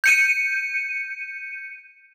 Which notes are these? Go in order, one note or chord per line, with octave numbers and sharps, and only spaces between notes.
G6 C#7 D#7